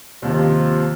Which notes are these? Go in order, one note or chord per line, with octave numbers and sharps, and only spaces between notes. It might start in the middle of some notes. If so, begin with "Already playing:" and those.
D#2 C3 F3